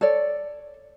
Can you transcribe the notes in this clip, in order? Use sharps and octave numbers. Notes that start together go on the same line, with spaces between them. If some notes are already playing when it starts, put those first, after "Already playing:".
A4 C#5 D5